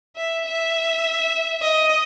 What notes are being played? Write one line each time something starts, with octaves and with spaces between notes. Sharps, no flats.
E5
E5
D#5